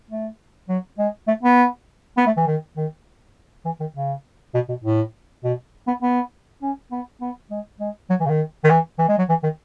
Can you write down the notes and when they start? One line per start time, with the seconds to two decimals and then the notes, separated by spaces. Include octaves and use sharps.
0.10 A3
0.69 F#3
0.98 G#3
1.28 A3
1.43 B3
2.17 B3
2.27 A3
2.37 E3
2.47 D#3
2.77 D#3
3.65 E3
3.80 D#3
3.95 C#3
4.54 B2
4.69 B2
4.84 A2
5.44 B2
5.87 B3
6.02 B3
6.62 C#4
6.92 B3
7.21 B3
7.51 G#3
7.80 G#3
8.10 F#3
8.20 E3
8.26 C#3
8.30 D#3
8.64 D#3
8.70 E3
8.99 E3
9.09 G#3
9.18 F#3
9.29 E3
9.43 D#3